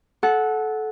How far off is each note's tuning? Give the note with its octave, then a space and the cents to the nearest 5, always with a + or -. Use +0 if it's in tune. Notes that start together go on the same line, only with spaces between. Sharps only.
A4 -20 F#5 -5